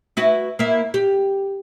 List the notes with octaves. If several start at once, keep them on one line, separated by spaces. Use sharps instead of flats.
E4 F#4 B4
A#3 E4
G4